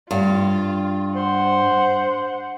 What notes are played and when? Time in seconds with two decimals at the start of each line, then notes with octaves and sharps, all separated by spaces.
0.11 G2 F4
1.16 C5 F#5